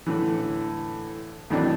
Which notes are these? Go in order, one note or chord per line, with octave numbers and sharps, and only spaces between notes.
A2 D3 E3
F2 A2 D#3 E3 F#3 D4